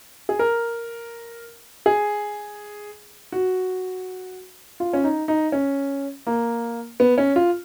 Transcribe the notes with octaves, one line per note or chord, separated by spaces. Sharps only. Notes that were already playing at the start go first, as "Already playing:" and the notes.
G#4
A#4
G#4
F#4
F4
C#4
D#4
D#4
C#4
A#3
B3
C#4
F4